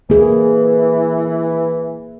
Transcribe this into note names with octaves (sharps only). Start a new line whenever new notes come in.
E3 A#3 G#4